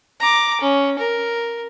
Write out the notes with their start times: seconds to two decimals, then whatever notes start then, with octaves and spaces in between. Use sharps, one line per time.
0.20 A#5 D6
0.61 C#4
0.99 A#4